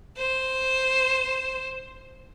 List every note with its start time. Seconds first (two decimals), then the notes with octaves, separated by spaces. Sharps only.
0.17 C5